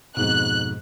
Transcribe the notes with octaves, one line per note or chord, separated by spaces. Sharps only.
F2 G#2 B2 F#6